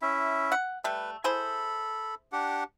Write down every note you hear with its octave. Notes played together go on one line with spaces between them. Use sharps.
C#4 E4 E5
F#5
G3 A3 B4
E4 G#4 A4 C5 B5
D4 G4 F#5